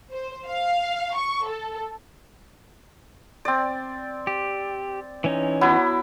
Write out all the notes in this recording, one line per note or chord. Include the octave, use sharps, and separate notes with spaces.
C5
F5
C#6
A4
C4 D5
G4
E3 C#4 D#4
F#3 B3 E4